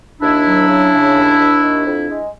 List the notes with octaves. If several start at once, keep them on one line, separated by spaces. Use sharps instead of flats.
D#2 D4 E4
F#3
C#3
C#3
D#2
D#2
D#3
F2
G#3